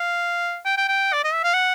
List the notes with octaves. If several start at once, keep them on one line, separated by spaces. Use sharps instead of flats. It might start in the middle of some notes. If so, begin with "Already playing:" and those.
Already playing: F5
G5
G5
G5
D5
D#5
E5
F5
F#5